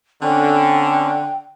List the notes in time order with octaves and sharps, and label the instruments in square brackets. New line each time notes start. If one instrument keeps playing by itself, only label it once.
[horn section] D3 [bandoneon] C4 C#4 [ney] G5